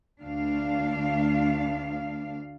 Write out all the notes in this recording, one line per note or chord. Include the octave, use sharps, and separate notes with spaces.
D2 D4 F5